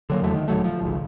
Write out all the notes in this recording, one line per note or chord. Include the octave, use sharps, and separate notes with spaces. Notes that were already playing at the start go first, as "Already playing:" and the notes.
D3 F#3 A#3
E2 D3 F#3 A3
D#3
D#1 D3 F#3 A3
F3
G#1 C#2